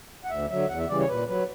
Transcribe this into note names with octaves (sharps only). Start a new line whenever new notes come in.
F#5
D2 E5
D3 F#3 E5
E2 F#5
E5
C#3 E3 G3 D5
C#5
A#2 B4
F#3 B4